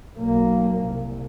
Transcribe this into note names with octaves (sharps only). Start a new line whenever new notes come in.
B1 A#3
C2